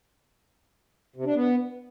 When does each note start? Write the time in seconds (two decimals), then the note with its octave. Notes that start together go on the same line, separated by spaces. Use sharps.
1.16 C3
1.26 D4
1.35 B3